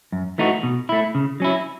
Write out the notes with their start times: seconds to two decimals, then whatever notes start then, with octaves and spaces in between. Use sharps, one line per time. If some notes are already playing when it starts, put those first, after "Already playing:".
0.12 F#2
0.38 E3 A3 D#4 F#4
0.63 B2
0.89 A3 E4
1.15 C#3
1.40 F#3 C#4 E4